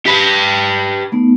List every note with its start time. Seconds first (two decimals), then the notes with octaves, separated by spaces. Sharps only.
0.06 G4 B4
1.12 A3 B3 D#4